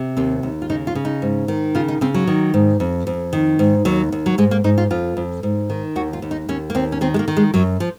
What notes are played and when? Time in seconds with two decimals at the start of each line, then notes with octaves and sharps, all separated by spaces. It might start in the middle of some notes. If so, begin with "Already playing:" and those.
Already playing: C3
0.17 D#2 C4
0.43 D#2
0.62 F4
0.70 C#3 D#4
0.87 F4
0.95 C#3
1.05 D#4
1.22 G#2
1.48 D#3
1.75 C#3 F4
1.88 D#4
2.01 C#3 C4
2.14 F#3
2.27 D#3
2.54 G#2
2.80 F2
3.07 F2
3.33 D#3
3.59 G#2
3.85 D#2 F#3
4.12 D#2
4.26 F#3
4.38 G#2 G#3
4.51 A#3
4.64 G#2 D#4
4.78 F4
4.91 F2 F4
5.17 F2
5.43 G#2
5.70 D#3
5.96 D#2 F#4
6.13 F4
6.22 D#2
6.31 D#4
6.49 D#2 C#4
6.70 A#3
6.75 D#2 C4
6.92 C#4
7.01 D#3 C4
7.14 G#3
7.19 A#3
7.28 D#3
7.37 G#3
7.54 F#2 F#3
7.80 F3